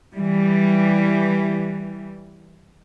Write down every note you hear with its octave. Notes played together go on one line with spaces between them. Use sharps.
E3 G3